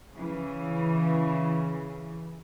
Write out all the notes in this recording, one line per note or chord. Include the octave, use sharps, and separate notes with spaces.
C#3 E3